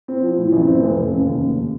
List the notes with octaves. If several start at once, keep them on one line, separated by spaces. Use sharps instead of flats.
C4
F3
A2
A1
C4
F1
F1
C#3
D#2
F1